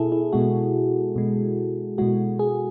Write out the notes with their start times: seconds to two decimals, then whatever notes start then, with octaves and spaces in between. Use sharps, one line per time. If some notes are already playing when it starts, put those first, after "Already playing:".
Already playing: B2 E4 G#4 A4
0.12 E4
0.33 B2 G#3 F#4
1.16 B2 G#3
1.98 B2 G#3 F#4
2.39 G#4